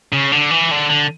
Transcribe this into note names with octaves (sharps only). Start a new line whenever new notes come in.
C#3
D3
E3
D3
D3